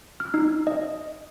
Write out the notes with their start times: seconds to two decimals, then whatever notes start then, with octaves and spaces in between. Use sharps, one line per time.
0.20 F6
0.34 D#4
0.67 D#5